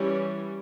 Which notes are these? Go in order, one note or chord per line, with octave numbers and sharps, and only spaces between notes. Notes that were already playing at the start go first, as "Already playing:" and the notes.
Already playing: E3 G3 C#4